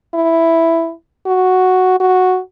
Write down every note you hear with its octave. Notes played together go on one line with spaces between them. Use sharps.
E4
F#4
F#4